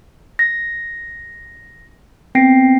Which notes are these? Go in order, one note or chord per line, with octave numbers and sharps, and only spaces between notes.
A#6
B3 C4 G5 A#6 C7 D7